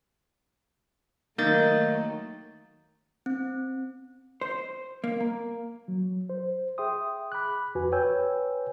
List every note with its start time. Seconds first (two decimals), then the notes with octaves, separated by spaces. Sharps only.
1.38 D#3 F#3 A3 A#3 D#4 G6 A6
3.26 C4
4.41 C5
5.04 A#3
5.20 A#3
5.88 F#3
6.29 C5
6.78 G#4 E5 G5 C6 D#6
7.32 B5 D6 F#6
7.75 F2 F#4 B4 G#5
7.92 B4 C#5 G5 G#5 E6 G6